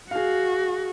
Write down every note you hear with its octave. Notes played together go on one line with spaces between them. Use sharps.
F#4 G#4 F5